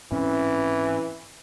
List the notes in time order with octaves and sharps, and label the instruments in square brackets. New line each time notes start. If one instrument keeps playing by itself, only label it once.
[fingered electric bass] G#2 C4 C#4 [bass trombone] E3